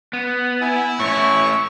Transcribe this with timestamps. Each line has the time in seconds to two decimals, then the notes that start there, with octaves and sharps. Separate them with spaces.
0.13 B3
0.61 E4 G#5
1.00 A2 C#4 C#6